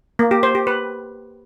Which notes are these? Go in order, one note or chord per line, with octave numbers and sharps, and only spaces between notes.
A#3
G4
C5
G4
B4